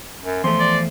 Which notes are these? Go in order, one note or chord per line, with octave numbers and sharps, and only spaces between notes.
F#2
E2 F3 A3 C6
D5